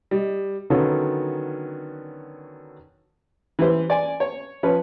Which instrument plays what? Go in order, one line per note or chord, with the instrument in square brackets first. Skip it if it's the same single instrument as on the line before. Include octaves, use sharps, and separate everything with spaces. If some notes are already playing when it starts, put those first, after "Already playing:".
[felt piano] G3 D#5
D3 D#3 F#3 B3 C#4 A4
[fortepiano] E3 G3 B4 C5
D5 G#5
C#5
F3 C#4 B4